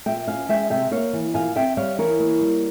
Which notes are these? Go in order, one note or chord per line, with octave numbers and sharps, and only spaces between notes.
A#2 E5 G5
C#4 F5 G#5
G#3 E5 G5
C3 E5 G5
A#3 C#5 F5
E3
A#2 F5 G#5
C4 E5 G5
G3 C#5 F5
E3 A#4 C#5
A#3
G3